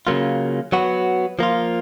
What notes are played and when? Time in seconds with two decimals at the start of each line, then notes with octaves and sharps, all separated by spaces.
0.07 C#3 F#3 A#3 F4
0.72 F#3 B3 F#4
1.39 F3 A#3 F4